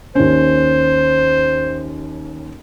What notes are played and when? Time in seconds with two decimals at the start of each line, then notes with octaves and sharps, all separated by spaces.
0.15 D#2 C#4 C5